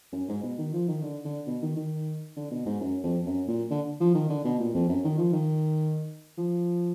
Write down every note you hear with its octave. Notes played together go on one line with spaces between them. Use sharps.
F#2
G#2
B2
D#3
F3
D#3
D3
D3
B2
D#3
D#3
D3
B2
G#2
F#2
F2
F#2
A#2
D3
F3
D#3
D3
B2
A#2
F2
F#2
D#3
F3
D#3
F3